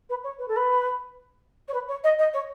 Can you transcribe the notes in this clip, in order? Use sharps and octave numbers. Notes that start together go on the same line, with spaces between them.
B4
C#5
B4
A4
B4
C#5
B4
C#5
D#5
D#5
C#5